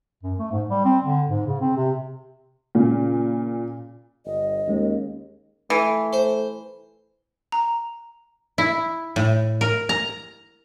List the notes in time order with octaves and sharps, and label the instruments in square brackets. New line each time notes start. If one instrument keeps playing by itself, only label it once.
[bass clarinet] F#2
A3
G#2
G3
C4
D3
G#2
C#3
C4
C3
[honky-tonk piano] A#2 C#3
[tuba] G1 [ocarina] D#5
[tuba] D#2 [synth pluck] G#3 C#4
[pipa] E3 [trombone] A3
[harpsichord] C5
[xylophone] A#5
[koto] E4
A2
A#4
A#5